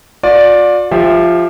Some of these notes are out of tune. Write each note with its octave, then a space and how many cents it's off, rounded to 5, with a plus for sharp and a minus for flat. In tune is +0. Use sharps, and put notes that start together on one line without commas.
F4 +45 D5 +0
F3 +0 G4 +30 E5 +0